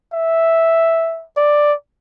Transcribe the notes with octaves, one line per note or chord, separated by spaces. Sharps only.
E5
D5